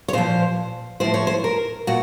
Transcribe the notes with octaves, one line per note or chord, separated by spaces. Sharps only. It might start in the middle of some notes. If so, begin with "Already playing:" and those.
C#5
A#2 F3 C5
A2 F3 C5
C#5
C5
A#4
A#2 F#4